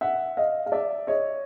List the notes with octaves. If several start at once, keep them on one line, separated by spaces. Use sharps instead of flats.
E5 F#5
D#5 F5
F5
D5 E5
C#5 D#5